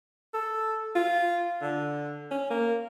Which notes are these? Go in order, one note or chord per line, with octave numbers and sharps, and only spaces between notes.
A4
F4
D3
C#4
A#3